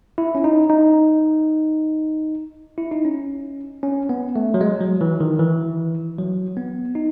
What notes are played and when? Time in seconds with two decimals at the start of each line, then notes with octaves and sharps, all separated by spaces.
0.18 E4
0.35 C#4
0.44 D#4
0.70 D#4
2.78 E4
2.91 D#4
3.05 C#4
3.83 C#4
4.09 B3
4.36 A3
4.54 F#3
4.61 G#3
4.81 F#3
5.01 E3
5.20 D#3
5.39 E3
6.18 F#3
6.57 B3
6.95 D#4